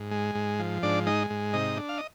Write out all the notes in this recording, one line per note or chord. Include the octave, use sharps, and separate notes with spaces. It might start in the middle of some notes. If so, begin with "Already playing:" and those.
Already playing: G#2
G#3
G#2
F3
G#2 D4 D5
G#3 D#4 D#5
G#2
C3 D#4 D#5
D4
F5
D#5